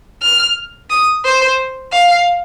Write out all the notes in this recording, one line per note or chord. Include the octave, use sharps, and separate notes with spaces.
F6
D#6
C5
F5